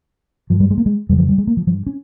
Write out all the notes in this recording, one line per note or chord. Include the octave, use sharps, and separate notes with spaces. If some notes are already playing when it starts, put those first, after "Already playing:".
G2 F3
G3
G#3
A#3
G#3
F2 C#3 G3
F3
G3
G#3
A#3
F3
G2 F3
C#4